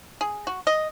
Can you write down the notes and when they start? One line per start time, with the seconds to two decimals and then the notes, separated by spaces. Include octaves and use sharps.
0.21 G#4
0.47 F#4
0.67 D#5